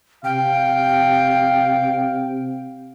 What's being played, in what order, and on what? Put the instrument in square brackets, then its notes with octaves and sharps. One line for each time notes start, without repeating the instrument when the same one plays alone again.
[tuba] C3 [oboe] F5 [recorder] G5